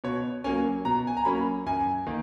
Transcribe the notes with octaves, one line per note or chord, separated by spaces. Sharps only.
B2 C#5
F#3 A#3 C#4 G#5
B2 A#5
G#5
A#5
F#3 A#3 C#4 B5
F#2 G#5
D#3 A#3